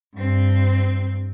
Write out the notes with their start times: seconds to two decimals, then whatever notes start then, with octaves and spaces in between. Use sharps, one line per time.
0.14 G2 C4